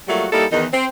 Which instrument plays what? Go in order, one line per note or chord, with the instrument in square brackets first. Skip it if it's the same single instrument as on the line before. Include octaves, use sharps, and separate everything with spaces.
[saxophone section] F#3 G3 A3 A#3 F4 F#4
G3 A#3 D#4 E4 G4 A4
E2 D#3 D#4
C4